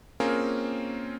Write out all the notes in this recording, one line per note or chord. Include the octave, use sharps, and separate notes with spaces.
A#3 C4 C#4 F4 G#4 A#4